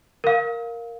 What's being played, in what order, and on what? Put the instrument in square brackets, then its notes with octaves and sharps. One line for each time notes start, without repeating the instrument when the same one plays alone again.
[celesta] A#4 F5